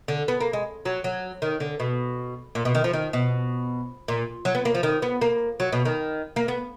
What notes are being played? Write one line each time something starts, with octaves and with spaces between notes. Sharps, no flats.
D3
B3
A#3
G#3
F#3
F#3
D#3
D3
B2
A#2
B2
D#3
F3
D#3
B2
A#2
F#3
B3
A#3
F3
D#3
B3
A#3
F#3
B2
D#3
A#3
B3